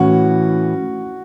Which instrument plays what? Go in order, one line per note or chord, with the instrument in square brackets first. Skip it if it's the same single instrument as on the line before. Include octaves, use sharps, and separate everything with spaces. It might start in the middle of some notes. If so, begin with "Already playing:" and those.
Already playing: [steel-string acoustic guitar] A2 E3 C#4 [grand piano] F#4